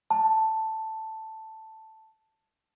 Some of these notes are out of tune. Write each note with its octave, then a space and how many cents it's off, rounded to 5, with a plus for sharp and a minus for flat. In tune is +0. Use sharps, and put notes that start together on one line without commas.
A5 +5